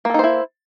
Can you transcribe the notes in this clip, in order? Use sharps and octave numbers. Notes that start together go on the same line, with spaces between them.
A#3 D#4 E4 A4 C5